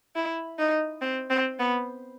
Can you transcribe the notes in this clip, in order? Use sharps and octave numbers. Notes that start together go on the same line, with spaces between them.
E4
D#4
C4
C4
B3